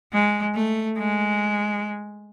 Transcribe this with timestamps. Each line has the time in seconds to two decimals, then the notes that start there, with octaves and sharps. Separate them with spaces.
0.13 G#3
0.55 A3
0.98 G#3